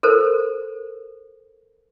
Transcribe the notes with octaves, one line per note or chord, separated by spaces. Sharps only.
A4 A#4 C5